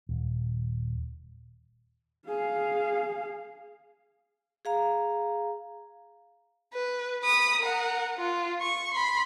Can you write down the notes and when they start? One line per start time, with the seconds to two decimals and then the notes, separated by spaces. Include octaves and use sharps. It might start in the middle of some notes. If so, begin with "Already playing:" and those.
0.09 D#1
2.28 G#4 F5
4.65 G#4 F5 A#5
6.73 B4
7.23 B5 D#6
7.61 A#4 F#5
8.18 F4
8.61 C#6
8.94 B5 C6